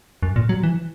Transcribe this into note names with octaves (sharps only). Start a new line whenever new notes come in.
F#2
A#2
F#3
E3